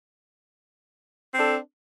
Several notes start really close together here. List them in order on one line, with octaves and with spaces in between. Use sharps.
C4 D4 A4